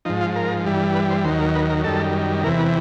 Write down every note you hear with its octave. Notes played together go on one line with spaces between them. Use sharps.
G#2 F3 D#4
F4
A#4
G2 E3 G3
B4
C5
D#2 D#3 F#3 C5
A#4
B4
A#4
F#2 D#3 G3 A4
E2 C3 E3 A#4
B4